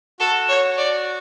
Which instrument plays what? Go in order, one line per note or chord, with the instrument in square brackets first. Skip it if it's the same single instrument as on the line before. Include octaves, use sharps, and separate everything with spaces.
[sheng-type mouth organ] F#4 [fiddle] A4
[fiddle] C#5
D5